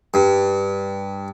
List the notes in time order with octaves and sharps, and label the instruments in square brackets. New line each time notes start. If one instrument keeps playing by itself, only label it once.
[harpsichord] G2